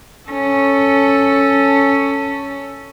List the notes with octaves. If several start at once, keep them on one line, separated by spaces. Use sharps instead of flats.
C#4 A4